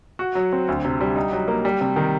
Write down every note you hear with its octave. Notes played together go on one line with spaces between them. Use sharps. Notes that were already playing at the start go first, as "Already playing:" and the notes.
F#4
F#3
C4
D2
C3
G3
D#4
F#3
A#3
G3
C3
D#3